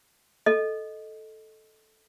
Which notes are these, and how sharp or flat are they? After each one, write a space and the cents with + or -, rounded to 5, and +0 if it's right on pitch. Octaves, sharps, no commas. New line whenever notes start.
A4 -5 D#5 +0